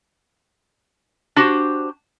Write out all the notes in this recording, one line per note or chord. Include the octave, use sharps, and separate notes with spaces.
D4 F#4 G4 C5